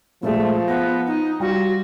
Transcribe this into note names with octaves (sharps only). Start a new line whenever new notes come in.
A#2 F3 G#3 A3
B3 A#6
D#4
G3 F4 F#4